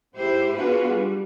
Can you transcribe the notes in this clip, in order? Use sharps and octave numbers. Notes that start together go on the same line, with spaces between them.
G#2 E4 G4 C5
B3 D4 F4 F#4 G#4 B4
G3